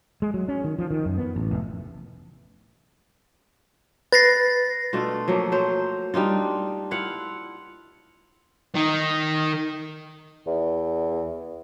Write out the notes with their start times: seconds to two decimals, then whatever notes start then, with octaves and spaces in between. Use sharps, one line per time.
0.22 G#3
0.34 F#3
0.48 C#4
0.64 D#3
0.79 F3
0.91 D#3
1.05 F#2
1.18 B3
1.36 A1
1.51 F1
4.13 B4 A6 A#6 C7
4.93 B2 A3 D4 F4
5.28 F3 F#3 A3 A#3
5.52 F#3 C5
6.14 G3 D4 D#4 F4
6.91 E4 F4 F5 F#5
8.75 D#3 D#4
10.47 E2